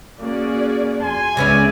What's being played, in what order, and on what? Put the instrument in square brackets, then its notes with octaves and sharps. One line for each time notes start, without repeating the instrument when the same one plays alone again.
[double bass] A#3 C#4 [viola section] F#4 G#4 D5
[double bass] F2 [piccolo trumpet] G#5 [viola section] C6
[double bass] C#2 G#3 [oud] C#3 B3 C#4 [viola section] D5 E5